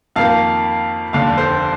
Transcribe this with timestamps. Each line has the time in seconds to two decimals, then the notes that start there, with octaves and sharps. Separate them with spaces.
0.16 F2 D#3 A#3 F5 A5
1.13 F1 D#2 D3 F5 A5
1.38 A4 C5